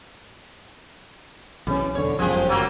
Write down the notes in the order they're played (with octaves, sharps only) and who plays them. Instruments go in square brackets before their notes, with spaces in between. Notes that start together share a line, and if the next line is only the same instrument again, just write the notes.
[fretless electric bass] B1 C#3 C#4 [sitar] E3
[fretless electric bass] E2 D3 [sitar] C#5
[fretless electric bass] G1 C#2 F#2 [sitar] F3 G4 G#4
[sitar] F#3 A#3 F4